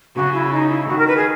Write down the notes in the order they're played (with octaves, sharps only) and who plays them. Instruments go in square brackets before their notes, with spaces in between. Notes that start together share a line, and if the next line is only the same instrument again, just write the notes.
[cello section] C#3 [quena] F#4
[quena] E4
D#4
E4
[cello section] D#3 [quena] F#4
[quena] A#4
B4
G#4